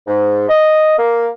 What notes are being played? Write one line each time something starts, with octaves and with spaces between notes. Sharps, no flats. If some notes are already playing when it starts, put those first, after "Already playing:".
G#2
D#5
A#3